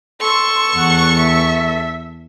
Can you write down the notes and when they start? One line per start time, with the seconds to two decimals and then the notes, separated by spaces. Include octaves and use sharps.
0.21 A4 C6 C#6
0.76 E2 F#5
1.19 E5